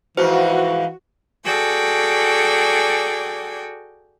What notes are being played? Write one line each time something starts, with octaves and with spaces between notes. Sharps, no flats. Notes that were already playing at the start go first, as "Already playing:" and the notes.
G#2 E3 F3 F#4 C5
F#4 G#4 A4 D5 G5 G#5